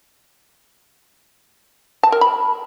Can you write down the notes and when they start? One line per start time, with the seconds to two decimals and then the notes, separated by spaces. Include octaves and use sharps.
2.03 A5
2.12 A#4
2.21 B5